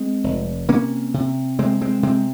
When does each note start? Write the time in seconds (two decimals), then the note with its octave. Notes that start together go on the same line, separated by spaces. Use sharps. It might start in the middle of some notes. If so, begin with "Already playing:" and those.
Already playing: G#3 C4
0.24 F1
0.68 C3 A#3 C#4
1.14 C3
1.59 C3 G#3 C4
1.81 G#3 C4
2.03 C3 G#3 C4